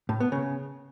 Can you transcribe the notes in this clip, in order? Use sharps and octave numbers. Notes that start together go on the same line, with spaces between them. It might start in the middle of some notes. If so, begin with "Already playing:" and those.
A2
B3
C#3